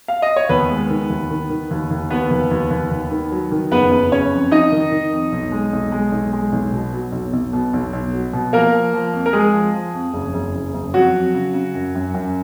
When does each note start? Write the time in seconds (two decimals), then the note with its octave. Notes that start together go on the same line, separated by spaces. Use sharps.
0.08 F5
0.22 D#5
0.36 C#5
0.49 D#2 B3 B4
0.71 G#3
0.90 D#3
1.10 D#2
1.31 D#3
1.50 D#3
1.71 D#2
1.91 D#2
2.11 D#2 B3 B4
2.31 D#2
2.51 D#2
2.71 D#2
2.91 D#2
3.11 D#3
3.32 F#3
3.51 D#3
3.71 F#1 B3 B4
3.91 F#1
4.11 F#1 C#4 C#5
4.31 F2
4.51 F2 D#4 D#5
4.72 D#3
4.92 D#3
5.12 F2
5.32 B1
5.52 G#3
5.73 B1
5.92 G#3
6.12 B1
6.33 G#3
6.52 B1
6.72 B2
6.93 F#3
7.12 B1
7.33 B1
7.53 B2
7.73 B1
7.93 B1
8.14 F#3
8.33 B2
8.53 F3 A#3 A#4
8.74 F3
8.94 F3
9.13 F2
9.26 A#4
9.33 G#3 G#4
9.54 F3
9.74 F3
9.94 F2
10.13 F#1
10.34 F#1
10.55 F#1
10.74 F#1
10.94 F2 F#3 F#4
11.15 F2
11.34 C#3
11.54 C#3
11.75 F#2
11.95 F#2
12.14 F#2